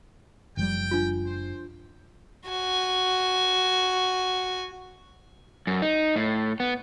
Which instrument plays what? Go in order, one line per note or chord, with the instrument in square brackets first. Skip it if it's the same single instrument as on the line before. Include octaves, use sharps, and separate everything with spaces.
[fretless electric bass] F#1 F3 G3 [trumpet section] G5
[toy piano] D4 F4
[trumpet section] C5
[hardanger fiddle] F#4 G#5
[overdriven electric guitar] F#2
D#4
A2
B3